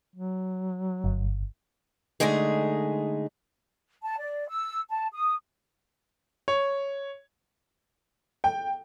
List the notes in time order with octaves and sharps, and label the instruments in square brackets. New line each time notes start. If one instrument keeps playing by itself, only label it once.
[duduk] F#3
[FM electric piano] G1
[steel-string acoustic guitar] D3 G#3 A3 D#4 G#4
[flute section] A5
D5
E6
A5
D#6
[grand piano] C#5
[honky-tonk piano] G5